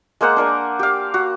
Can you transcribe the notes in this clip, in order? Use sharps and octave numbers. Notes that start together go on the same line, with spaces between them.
G#3 A#3 C5 F#5
D4 A#4 G#5
G4 F5
F#4